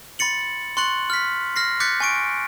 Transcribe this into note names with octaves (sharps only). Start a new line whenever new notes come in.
B5 C6 A6 C#7 F#7
C6 C#6 F#6 A6 C#7 F#7
F6 B6
F6 A#6 C7
D6 F#6 G6 A6 B6 C#7
G#5 C#6 D7